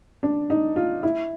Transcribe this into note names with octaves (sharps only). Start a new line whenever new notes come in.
D4
D#4
F4
E4